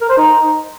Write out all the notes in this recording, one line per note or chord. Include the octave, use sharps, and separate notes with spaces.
A#4
C5
D#4